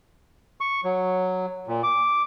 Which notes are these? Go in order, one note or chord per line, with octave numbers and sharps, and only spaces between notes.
C#6
F#3
A#2
D6